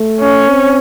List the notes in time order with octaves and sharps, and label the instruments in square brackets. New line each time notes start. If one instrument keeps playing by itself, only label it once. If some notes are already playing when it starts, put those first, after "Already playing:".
Already playing: [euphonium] A3
[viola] C#4
[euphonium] C4